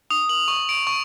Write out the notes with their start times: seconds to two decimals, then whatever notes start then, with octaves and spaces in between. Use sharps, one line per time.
0.10 D#6
0.29 F#7
0.48 C#6
0.69 D7
0.87 C#6